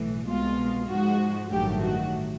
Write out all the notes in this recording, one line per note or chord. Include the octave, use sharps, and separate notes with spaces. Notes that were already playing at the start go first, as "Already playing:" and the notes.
Already playing: B1 A2 E3
C2 B2 G#3 F4
G#2 F3 G#3 F#4
A1 G2 D#3 F#3 A3 G4
F#4